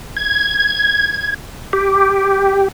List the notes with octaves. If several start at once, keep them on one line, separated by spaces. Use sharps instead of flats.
G#6
G4